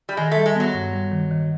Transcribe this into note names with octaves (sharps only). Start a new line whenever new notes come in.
G3
D#3 G#3
A3
G3
G#3
F#3 B3
G2
G3
D#3
D#3